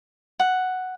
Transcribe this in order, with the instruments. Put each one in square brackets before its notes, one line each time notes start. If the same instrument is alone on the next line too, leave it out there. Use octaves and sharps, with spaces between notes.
[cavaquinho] F#5